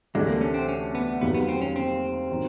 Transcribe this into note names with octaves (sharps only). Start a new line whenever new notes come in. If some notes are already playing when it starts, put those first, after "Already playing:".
D2 C3 E3 G#3 A3 D4
A#3
C#4
C4
C#4
B3
F1 D#2 D#3 F#3 B3
B3
C4
C#4
C4
D#3 F#3